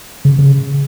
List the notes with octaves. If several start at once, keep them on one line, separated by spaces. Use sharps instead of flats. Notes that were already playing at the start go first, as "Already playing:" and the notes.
C#3
C#3